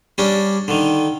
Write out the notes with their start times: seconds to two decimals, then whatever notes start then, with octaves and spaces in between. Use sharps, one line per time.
0.18 G3 C#4 D4
0.68 D3 D#3